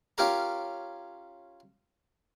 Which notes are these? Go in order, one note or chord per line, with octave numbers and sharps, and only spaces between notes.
C#4 F4 G4 A#4 C#5 A#5